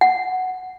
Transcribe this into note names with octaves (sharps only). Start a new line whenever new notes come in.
F#5